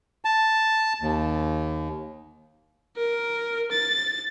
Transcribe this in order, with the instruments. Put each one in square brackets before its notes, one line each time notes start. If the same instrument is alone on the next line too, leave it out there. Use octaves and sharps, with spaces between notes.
[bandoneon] A5
D#2
[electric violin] A#4
A6